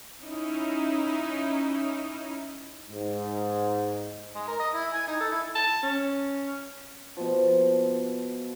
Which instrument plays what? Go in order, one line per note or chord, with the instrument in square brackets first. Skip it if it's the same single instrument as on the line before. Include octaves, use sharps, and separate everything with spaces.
[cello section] C#4 D#4 E4
[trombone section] G#2
[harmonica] G#3
A#4
D#5
E4
G#5
D#4
A4
E4
[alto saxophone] A5
C#4
[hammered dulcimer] B2 F3